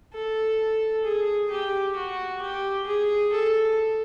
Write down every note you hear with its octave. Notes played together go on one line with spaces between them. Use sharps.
A4
G#4
G4
F#4
G4
G#4
A4